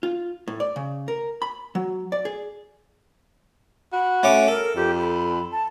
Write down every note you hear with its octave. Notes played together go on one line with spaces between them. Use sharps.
F4
A2
D5
C#3
A#4
B5
F#3
D5
G#4
F#4 B5
A3 C#4 D6
A4 A#4
F2 G4
B5
A5